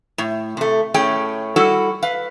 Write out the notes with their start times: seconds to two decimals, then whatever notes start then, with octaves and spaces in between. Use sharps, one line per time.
0.18 A2
0.57 C3 A3
0.94 A2 A3 C#4 G#4 G5
1.56 G3 E4 F#4 A4
2.02 B4 F5